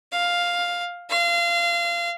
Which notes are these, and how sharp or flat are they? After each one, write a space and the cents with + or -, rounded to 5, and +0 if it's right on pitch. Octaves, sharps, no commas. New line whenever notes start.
F5 +5
F5 -25